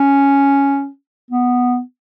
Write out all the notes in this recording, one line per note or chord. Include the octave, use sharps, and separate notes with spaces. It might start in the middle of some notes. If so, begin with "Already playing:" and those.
Already playing: C#4
B3